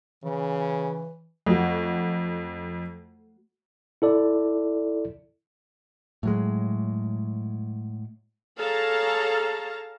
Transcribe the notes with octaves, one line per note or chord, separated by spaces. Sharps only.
C#3 E3
F2 A3 F#4
E4 A4 D5
A2 F#3 G#3
G#4 A4 C#5 F5 A5 A#5